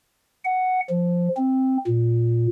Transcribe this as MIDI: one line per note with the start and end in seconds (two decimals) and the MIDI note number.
0.45 0.80 78
0.90 1.29 53
1.37 1.77 60
1.87 2.47 46